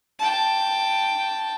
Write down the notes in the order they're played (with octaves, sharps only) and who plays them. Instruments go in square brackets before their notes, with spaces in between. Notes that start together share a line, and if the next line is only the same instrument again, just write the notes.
[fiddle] G5 A5